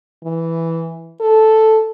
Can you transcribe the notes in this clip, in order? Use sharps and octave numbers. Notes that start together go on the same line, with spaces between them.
E3
A4